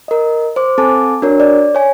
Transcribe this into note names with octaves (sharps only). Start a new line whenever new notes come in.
A#4 D#5
C5 D6
C4 A4 G#5 A5 D6
D4 F#4 A#4 C#5
D5
C#5 G#5